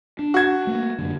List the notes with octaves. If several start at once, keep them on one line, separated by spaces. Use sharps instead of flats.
D4
F#4 G#6
A3 A#3
F#2 D3